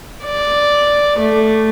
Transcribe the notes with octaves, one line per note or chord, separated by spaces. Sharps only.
D5
A3